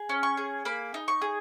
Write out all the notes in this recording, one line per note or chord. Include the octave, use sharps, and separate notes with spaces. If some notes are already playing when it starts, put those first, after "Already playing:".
Already playing: G#4
C#4
C#6
G#4
A#3 B5
D#4
C#6
G#4